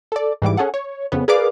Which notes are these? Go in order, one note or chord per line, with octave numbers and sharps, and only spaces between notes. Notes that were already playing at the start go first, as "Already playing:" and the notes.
A4 D5
G#2 E3 G3 D6
C#4 G#4 A4 F#5
C#5
F2 C#3 B3
G#4 A#4 B4 D5 F5 D6